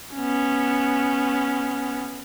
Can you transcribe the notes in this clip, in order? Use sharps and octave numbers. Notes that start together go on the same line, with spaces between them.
B3 C#4